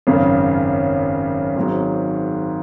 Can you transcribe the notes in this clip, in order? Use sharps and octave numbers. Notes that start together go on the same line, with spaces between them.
G#1 F#2 C#3
G#1 G#2 F#3